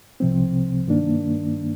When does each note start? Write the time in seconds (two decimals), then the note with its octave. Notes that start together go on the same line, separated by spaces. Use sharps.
0.20 C2 C3 F3 C4
0.87 G2 D#3 A#3 D4